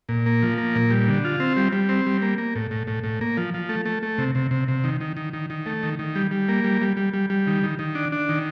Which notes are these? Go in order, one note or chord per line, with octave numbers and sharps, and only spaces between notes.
A#2
A#3
F3
A#3
A#2
G3
D3
F4
C4
G3
G3
C4
G3
A#3
A#3
A2
A2
A2
A2
A#3
F3
F3
A3
A3
A3
C3
C3
C3
C3
D#3
D#3
D#3
D#3
D#3
A3
D#3
D#3
G3
G3
A#3
G3
G3
G3
G3
G3
D#3
D#3
D#3
D4
D4
D#3